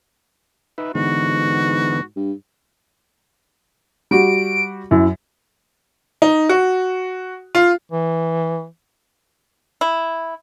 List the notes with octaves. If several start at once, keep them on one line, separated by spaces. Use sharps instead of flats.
D#4 B4 E5
G#2 D3 E3 B3 F#4
G2
G3 F#4 D7
F#2 E4
D#4
F#4
F4
E3
E4